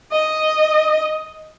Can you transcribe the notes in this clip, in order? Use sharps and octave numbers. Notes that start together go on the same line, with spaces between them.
D#5